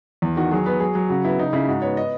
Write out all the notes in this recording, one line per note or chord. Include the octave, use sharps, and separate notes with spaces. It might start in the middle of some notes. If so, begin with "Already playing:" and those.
E2
D#3 F#4
F#3 G#4
B3 B4
F#3 G#4
F#3
C#3 F#4
B3 E4
C#3 D#4
C#3 E4
G#2 F#4
B3 C#5
D#5